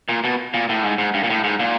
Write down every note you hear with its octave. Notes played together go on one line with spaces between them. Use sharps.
A#2
B2
A#2
A2
G#2
G#2
G2
A#2
A2
G#2
A#2